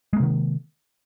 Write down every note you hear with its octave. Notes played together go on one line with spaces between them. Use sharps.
C3 D#3 G#3 A#3